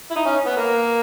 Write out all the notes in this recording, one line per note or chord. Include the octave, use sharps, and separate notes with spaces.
E4
D#4
C#4
B3
A#3